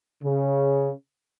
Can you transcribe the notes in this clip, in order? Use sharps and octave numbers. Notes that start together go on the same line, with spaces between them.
C#3